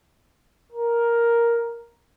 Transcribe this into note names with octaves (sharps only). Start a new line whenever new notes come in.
A#4